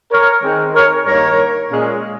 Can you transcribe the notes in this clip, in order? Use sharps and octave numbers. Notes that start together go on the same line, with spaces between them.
A#4 C#5
D#3 G#3 C4
A#4 C#5
G2 D#3 A#3 A#4 C#5
A#2 G#3 C#4